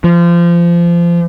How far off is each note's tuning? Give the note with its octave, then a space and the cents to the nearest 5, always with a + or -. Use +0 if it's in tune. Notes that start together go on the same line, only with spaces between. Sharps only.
F3 -25